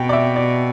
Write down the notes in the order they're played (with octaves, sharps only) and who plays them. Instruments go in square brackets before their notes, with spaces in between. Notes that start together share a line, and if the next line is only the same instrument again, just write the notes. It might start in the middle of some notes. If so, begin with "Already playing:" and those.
Already playing: [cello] B2 [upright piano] G5
[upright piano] D5
E5
D5